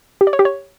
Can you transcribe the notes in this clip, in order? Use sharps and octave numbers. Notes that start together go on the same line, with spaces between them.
G4
D5
C#5
G4
C#5